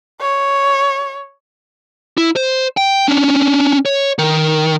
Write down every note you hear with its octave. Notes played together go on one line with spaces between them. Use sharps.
C#5
E4
C5
G5
C#4 D4
C#5
D#3